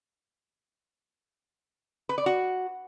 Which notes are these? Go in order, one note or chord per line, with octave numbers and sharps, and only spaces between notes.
B4
D5
F#4